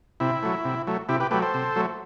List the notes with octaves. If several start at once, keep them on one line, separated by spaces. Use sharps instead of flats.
C3 E4
F#3 A3
C3
F#3 A3
C3 E4 G4
G4 B4
F#3 A3 G4 B4
A4 C5
C3
F#3 A3